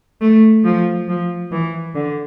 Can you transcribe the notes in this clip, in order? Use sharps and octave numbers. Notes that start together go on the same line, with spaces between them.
A3
F3
F3
E3
D3